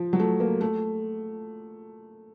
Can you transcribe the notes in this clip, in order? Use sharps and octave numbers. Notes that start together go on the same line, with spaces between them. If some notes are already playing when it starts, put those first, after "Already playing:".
Already playing: F3
F#3
A3
A#3
A3